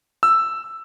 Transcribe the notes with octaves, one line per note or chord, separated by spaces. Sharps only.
E6